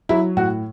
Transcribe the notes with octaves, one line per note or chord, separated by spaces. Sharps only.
F#3 E4
A2 F#4